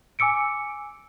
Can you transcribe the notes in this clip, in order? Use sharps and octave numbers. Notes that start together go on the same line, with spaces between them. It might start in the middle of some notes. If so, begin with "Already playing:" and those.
G#5 D6 E6 C#7 D7